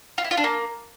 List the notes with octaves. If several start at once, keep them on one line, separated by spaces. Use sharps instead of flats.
F4
E4
F4
D4
A#3